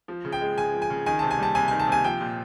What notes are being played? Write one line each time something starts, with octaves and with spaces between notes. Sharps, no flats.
F3
C#3
G5
G#3
C#3 G#5
F3
G#5
C#3
D#3 G#5
C3 A5
G#5
G3 A5
C3 G#5
D#3 G#5
A5
C3 G#5
F3 G5
A#2